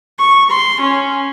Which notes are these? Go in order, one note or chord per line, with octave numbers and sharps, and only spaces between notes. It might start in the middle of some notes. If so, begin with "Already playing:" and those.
C#6
C6
C#4